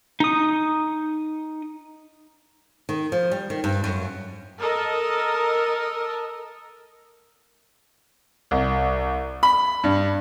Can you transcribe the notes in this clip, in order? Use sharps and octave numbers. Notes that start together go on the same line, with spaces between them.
D#4 D#6
D#3
F3
G3
D#3
G2
F#2
A4 A#4 D#5
C2
B5
G2